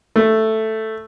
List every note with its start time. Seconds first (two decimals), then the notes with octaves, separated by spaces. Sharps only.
0.16 A3